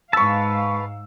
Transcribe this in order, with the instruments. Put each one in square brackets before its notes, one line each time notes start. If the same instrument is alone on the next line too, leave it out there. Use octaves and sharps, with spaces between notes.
[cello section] G#2 F5 [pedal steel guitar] B4 A5 [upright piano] C#6 E6